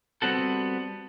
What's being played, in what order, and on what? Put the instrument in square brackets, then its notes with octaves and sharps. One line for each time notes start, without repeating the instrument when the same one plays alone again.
[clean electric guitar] G3 B3 C4 F#4 A4